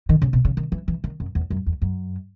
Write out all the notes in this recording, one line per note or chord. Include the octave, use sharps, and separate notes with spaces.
D#3
C#3
B2
C#3
D#3
E3
E3
D#3
F#2
E2
F#2
E2
F#2